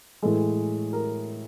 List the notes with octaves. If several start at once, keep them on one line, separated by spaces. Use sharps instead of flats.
A2 E3 G#3 A4
A#4